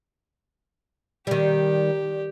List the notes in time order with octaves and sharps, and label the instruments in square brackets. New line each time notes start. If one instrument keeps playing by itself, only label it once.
[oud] D#3 G3 [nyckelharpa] G4